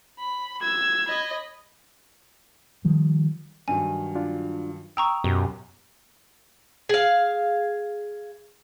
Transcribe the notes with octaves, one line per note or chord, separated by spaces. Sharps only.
B5
E6 G#6
D#5 B5
D#3 F3 G3
G2 D#3 F#3 G#5
D4 F4
G5 A#5 C#6 D#6 E6
F#2 B2 G4
G#4 F5